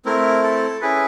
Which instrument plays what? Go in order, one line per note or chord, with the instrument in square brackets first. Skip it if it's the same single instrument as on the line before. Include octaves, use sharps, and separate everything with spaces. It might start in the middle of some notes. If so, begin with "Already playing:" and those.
[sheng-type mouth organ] A3 C4 E4 A#4
A4
C#4 E4 G#4 B4